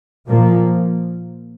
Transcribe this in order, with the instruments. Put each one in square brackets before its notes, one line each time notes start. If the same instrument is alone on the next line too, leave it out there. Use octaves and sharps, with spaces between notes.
[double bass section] A#2 F3 A#3